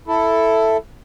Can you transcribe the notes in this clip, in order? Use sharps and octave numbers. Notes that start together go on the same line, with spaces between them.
E4 A4